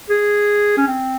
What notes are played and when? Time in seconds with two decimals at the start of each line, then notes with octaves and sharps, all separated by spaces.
0.10 G#4
0.77 C#4
0.87 C4